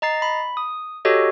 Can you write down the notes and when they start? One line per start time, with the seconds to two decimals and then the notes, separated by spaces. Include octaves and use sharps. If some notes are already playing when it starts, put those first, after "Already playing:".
0.02 D#5 A#5 A6 C7
0.22 B5
0.57 D#6
1.05 F#4 G4 A4 C#5 D#5